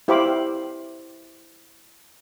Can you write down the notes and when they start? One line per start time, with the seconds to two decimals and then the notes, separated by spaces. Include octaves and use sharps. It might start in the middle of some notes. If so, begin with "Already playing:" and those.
0.08 E4 G4 C5 F5 B5 D6